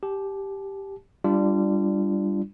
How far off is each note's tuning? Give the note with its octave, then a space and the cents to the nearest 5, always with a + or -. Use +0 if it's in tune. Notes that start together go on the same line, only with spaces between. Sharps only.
G4 +0 A5 -35
G3 +10 D4 +0 F4 -30